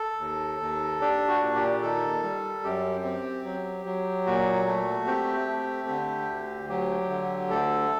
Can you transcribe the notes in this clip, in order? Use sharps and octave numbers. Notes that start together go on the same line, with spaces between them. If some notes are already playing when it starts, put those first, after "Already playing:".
Already playing: A4
D#2
D#2
D4 G4
F#4
A#2
G4
D#3 A4
G3
F#2 G4
C4
F#3
F#3
A#2 F#4
A3
C4 G4
A3
D3
D2
F#3 G4
D3
D2 A4